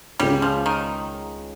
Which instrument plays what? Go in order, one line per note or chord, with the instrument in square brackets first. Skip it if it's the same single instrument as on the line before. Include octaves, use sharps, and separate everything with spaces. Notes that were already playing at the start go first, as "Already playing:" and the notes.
[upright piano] C#2 C#3 G#3 C#4 [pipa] G3
[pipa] F3
D#3